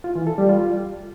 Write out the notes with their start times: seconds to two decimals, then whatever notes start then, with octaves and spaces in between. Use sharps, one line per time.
0.04 F4
0.15 E3
0.27 A4
0.38 G3
0.49 F4